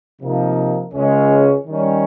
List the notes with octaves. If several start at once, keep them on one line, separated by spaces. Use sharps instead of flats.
C3 F3 A#3 D#4 A#4
C#2 C#3 G#3 C#4
D#3 G3 C#4